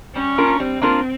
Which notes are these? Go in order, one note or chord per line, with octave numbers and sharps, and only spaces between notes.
G3 C#4
A#3 D4 F4 A#4
G3 C4
A#3 D4 F4 A#4